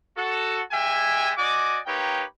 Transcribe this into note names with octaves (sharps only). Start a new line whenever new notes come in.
F#4 A4
G#3 G4 E5 G5 G#5
F#4 D5 D#5 G#5 D6
A#3 D#4 G4 B4 C#5 G5